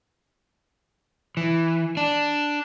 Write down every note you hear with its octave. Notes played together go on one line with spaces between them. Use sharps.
E3
D4